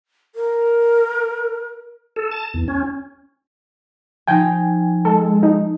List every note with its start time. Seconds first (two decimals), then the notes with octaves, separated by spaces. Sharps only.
0.35 A#4
2.16 A4
2.31 A5
2.54 E2
2.68 C#4
4.28 F3 D#4 F4 G5 G#5
5.05 G#3 A4
5.43 D#4